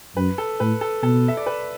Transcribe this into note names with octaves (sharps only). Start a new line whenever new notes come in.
F#2 B4
A4
A2 B4
A4
B2 A4
E5
D5
B4